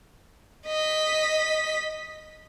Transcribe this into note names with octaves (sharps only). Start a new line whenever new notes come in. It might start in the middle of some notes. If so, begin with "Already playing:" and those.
D#5 B6